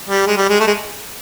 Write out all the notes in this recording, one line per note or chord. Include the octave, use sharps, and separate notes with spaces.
G3
G#3
G3
G#3
A3
G#3